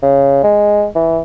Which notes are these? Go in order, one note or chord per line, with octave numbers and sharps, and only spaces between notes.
C#3
G#3
E3